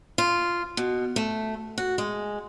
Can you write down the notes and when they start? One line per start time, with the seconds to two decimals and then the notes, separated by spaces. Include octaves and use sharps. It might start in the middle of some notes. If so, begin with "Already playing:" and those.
0.18 F4
0.77 B2
1.16 A3
1.78 F#4
1.98 G#3